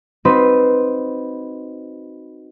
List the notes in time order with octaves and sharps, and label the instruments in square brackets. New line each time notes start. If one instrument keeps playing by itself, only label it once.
[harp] C4 D#4 F#4 B4 C5